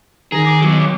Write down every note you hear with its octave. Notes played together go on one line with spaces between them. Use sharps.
D#3 G#4 A#5
D6
B2 F#3